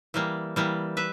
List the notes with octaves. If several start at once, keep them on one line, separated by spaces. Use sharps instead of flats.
E3 G3 A#3
E3 G3 A#3
B4 E5